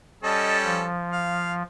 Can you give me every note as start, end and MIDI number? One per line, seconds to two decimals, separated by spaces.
0.23 0.86 55
0.23 0.86 61
0.23 0.86 69
0.23 0.57 75
0.23 0.57 81
0.64 1.62 53
1.12 1.53 77